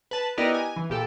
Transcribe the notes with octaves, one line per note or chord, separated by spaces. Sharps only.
B4 A5
B3 E4 G4 A#4 D5 D#5
G#5
E3
A#2 G4 A4